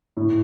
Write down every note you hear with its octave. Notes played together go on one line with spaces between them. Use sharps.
A2